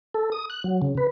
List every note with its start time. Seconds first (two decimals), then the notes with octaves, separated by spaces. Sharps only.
0.14 A4
0.32 D#6
0.50 F#6
0.64 F#3
0.82 C#3
0.97 B4